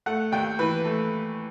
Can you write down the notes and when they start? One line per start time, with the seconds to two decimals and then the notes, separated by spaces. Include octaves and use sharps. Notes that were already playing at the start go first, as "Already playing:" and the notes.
0.06 A3 F#5
0.32 D#2 G5
0.59 E3 B4
0.85 A3